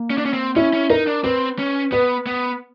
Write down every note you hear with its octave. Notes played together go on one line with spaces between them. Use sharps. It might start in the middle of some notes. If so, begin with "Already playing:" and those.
Already playing: A#3
C#4
D4
C#4
C4
C#4 E4
C#4
D#4 A#4
D4
C4 B4
C#4
B3 B4
B3